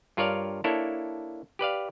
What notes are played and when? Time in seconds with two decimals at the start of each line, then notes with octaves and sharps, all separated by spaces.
0.17 G2 F4 A#4 C#5 D5 F5
0.64 A#3 D4 E4 A4 C#5
1.59 G4 B4 D5 F5